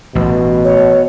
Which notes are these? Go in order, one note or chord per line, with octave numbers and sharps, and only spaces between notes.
A1 B2
C#5